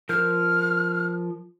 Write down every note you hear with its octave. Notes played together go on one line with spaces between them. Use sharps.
F3 A#4 F6 G6